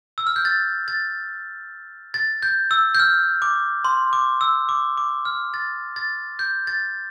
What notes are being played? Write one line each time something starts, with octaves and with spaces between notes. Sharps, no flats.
E6
F6
G6
A6
A6
A6
G6
E6
G6
F6
D6
C6
D6
E6
D6
D6
F6
A6
A6
G6
A6